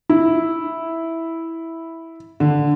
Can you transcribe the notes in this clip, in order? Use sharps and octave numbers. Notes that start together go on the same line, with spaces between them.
E4
D3